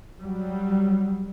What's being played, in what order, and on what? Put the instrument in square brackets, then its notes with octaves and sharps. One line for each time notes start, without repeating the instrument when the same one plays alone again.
[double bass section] F#3 G3